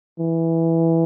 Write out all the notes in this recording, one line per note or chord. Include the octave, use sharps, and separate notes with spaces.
E3